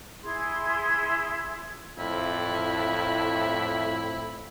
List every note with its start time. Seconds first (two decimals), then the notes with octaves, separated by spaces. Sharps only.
0.24 E4 G#4 C6 G#6
1.98 F2 A2 E4